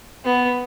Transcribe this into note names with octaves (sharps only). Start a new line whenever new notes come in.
B3